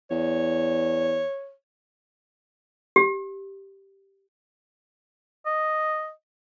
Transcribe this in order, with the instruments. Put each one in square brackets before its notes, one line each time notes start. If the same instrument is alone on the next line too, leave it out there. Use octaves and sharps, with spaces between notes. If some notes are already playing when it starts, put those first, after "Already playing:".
[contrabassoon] E2 [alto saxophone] C#5
[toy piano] G4
[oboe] D#5